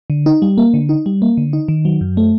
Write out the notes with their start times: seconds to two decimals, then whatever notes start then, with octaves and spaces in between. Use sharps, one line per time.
0.10 D3
0.26 D#4
0.42 G3
0.58 A#3
0.74 D3
0.89 D#4
1.06 G3
1.22 A#3
1.37 D3
1.53 D#4
1.68 D#3
1.85 F#3
2.01 F#2
2.17 A3